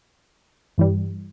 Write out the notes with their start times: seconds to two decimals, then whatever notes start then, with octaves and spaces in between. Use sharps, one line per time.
0.78 G2 E3 G3